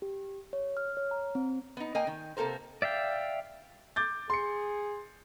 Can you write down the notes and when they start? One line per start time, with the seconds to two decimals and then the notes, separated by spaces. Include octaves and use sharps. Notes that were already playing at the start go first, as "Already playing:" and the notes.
0.02 G4
0.53 C#5
0.77 F6
0.97 C#5
1.11 A#5
1.35 C4
1.77 B3 D#4
1.95 A#3 D#5 G5 G#5
2.07 D#3
2.37 C3 A#3 A4 A#4 C5
2.82 D5 E5 F5 G5
3.96 D6 G6 A6
4.30 G#4 C6 C#7